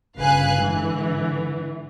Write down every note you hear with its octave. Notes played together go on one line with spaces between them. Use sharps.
G1 C#3 B4 F5 G#5 F#6
G#2 D3 E3